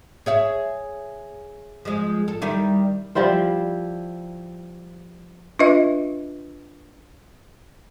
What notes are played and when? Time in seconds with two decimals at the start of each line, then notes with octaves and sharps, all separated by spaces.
0.26 G#4 C#5 E5
1.85 F3 G#3
2.28 A4
2.42 D#3 G3 E4
3.15 F3 G3 E4 C5
5.59 D4 F4 B4 D#5 E5